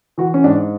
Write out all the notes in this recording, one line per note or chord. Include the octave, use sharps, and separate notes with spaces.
E3 F#4
C#4
G#2 D4